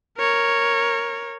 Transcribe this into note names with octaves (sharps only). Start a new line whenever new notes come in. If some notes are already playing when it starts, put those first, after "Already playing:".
A#4 C#5